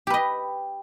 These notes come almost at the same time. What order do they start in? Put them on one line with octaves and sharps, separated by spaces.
G4 B4 D#5